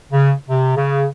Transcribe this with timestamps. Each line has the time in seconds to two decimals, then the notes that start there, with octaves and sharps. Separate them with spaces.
0.12 C#3
0.49 C3
0.76 C#3